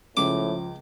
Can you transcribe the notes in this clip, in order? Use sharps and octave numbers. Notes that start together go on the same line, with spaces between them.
C#2 A2 F3 D6